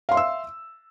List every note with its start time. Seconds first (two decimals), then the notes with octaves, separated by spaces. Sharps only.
0.09 F5
0.12 C6
0.14 E5
0.17 E6